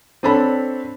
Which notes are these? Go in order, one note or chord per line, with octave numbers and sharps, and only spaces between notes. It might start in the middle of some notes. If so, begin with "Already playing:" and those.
C4 D4 A4 C#5 B5